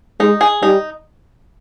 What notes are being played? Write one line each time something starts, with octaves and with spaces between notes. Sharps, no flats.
G#3 D#4
G#4
G3 D#4